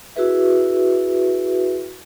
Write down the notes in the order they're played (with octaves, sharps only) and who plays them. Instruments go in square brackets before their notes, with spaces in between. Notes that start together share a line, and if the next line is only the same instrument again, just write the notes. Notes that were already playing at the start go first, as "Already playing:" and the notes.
[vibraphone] E4 F#4 G#4 B4 E5